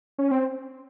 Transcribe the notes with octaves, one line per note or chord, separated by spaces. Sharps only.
C#4
C4